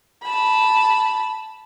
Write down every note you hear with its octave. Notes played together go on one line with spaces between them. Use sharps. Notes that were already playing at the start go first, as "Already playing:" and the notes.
A5 B5